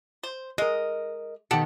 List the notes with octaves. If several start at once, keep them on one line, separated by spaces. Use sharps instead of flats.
C5
G#3 A#4 D#5
B2 D#3 G4 A4 F#5